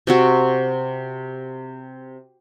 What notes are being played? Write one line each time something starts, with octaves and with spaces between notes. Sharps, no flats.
C3 C4 F#4